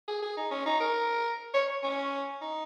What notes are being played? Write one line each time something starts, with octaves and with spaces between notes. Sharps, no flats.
G#4
G#4
D#4
C#4
D#4
A#4
C#5
C#4
D#4